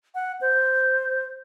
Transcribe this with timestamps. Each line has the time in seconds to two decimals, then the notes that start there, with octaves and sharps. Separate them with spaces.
0.15 F#5
0.41 C5